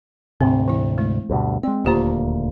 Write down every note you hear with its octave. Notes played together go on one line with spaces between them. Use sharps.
D2 G#2 C3 C4
E3 E4
G#3 A3 E4
D2 G2 B2
G#3 C4 D5
D#1 D2 A#3 F4 G4 C5